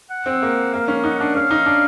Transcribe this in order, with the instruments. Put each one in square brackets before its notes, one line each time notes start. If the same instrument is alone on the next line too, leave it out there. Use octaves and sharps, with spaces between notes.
[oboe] F#5
[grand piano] C4
A#3
[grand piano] A#3 [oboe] F5
[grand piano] C#4
[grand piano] D#4 [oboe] F#5
[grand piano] D4 [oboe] F#5
[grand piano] C#4 [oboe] F5
[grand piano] D#4
D4